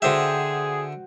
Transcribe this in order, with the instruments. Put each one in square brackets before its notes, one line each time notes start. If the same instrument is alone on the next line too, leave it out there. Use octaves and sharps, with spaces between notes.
[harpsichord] D3 E5 [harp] F#4 C5 G5 [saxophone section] G#4